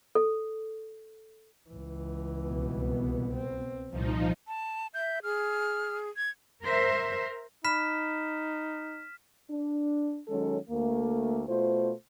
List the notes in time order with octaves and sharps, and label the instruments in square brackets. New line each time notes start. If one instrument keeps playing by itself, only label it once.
[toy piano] A4
[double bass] C#2 E3
[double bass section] C2 B2 B3
[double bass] C4
[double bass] C2 A#2 [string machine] F3 D#4
[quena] A5
[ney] E5 [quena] G6
[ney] G#4 [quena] F6
[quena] G#6
[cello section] A#4 C5 E5
[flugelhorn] D#4 [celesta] B5 [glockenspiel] F6 B6 E7
[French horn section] D4
D#3 F#3 G#3 C#4 A4
D2 A3 A#3
B2 A3 F4 C5